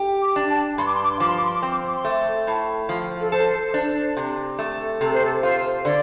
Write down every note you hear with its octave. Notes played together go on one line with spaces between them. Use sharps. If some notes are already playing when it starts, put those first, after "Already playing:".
Already playing: G4
D6
D4
A5
G2 C6
D6
C6
D6
C6
F3 D6
C6
D6
C6
D6
C4 C6
D6
C6
D6
C6
A3
A2 A5
F3 F5
A4
A4 C5
D4
C3
A3
C3 A4
C5
A4
F4 C5
D3 D5